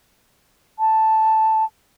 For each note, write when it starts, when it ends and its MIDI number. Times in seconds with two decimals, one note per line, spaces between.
0.79 1.65 81